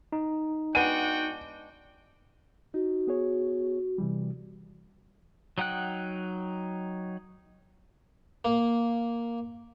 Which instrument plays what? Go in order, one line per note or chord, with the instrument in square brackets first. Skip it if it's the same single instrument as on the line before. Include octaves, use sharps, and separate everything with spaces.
[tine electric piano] D#4
[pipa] G#3 B3 D4 [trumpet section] F#4 F#5 G5 [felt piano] D#7
[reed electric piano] D#4 [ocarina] F#4
[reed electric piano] B3 G#4 C#5
C3 E3 G3
[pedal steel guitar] F#3 D#4 F#5 G5 F#6
[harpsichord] A#3